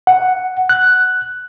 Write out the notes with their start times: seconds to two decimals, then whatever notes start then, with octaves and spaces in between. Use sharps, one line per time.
0.07 F#5
0.69 F#6